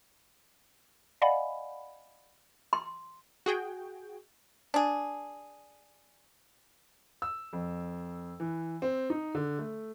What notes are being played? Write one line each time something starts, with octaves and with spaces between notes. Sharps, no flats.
D5 D#5 F5 F#5 G#5 B5
C6
F#4 G#4 G5
D4 G#4
E6
F2
E3
C4
D#4
D3
A3